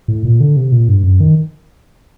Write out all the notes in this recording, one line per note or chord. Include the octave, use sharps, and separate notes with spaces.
A2
A#2
D3
C3
A#2
G2
F#2
D#3